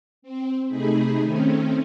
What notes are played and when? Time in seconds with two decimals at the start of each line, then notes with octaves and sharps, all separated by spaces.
0.22 C4
0.67 C3 A3 D#4 G#4 B5
1.22 D#3 A3 C4 C#4